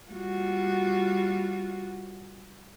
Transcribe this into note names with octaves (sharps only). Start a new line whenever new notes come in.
G3 F4 F#4